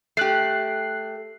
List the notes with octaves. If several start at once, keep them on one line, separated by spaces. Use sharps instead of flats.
A3 G4 F#6 C7